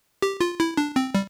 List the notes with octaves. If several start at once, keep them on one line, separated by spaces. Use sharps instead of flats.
G4
F4
E4
D4
C4
G3